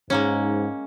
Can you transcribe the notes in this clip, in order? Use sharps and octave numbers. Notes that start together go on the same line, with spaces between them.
G#2 G#3 A#3 C#4